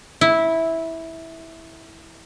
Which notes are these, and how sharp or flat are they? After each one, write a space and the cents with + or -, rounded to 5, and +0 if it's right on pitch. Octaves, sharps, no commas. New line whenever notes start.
E4 -10